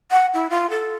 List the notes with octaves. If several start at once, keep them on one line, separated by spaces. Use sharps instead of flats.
F#5
E4
F4
A4